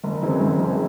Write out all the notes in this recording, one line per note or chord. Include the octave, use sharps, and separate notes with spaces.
F#1
F#2 E3 G#3 C4
F#1
F#2 E3 G#3 C4